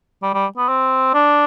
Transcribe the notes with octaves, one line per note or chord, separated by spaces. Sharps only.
G3
G3
B3
C4
D4